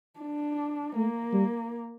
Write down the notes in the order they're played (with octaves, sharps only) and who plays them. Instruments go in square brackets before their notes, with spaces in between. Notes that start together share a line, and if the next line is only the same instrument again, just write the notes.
[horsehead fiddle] D4
[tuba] A3 [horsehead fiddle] A#3
[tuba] G3